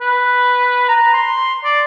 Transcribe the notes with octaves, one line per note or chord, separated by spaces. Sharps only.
B4
A#5
C6
D5